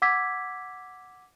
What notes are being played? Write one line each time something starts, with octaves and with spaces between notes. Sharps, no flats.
F#5 D6 E6 G#6 B6